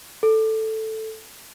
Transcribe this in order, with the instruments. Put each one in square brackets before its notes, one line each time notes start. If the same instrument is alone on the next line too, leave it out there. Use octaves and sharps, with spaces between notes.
[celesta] A4